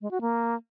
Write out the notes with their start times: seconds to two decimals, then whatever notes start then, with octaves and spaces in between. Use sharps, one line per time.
0.01 G#3
0.11 F#4
0.21 A#3